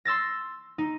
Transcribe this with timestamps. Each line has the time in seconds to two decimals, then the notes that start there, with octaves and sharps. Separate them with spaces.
0.05 C6 E6 A6 A#6
0.78 D#4